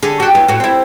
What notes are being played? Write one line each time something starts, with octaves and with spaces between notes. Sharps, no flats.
D3 G#4
F#4 G4
B3 E4
A2 F#4
C4 E4